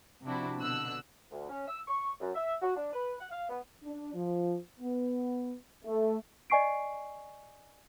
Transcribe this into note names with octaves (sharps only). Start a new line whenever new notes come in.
C3 F3 C4 D4 E4 F#4
B2 D3 E6 F#6
D2
C#4
E6
C#6
F#2
E5
F#4
D4
B4
F#5
F5
B3
D4
F3
B3
A3
D5 D#5 G#5 C#6 C7 D7